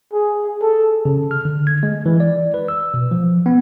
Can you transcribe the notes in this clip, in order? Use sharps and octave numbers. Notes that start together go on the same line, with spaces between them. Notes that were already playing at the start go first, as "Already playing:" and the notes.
G#4
A4
C#3
F6
D3
G#6
G#3
E3
D5
B4
E6
B2
F3
B3